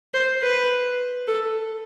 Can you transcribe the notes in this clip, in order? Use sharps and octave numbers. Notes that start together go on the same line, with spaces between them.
C5
B4
A4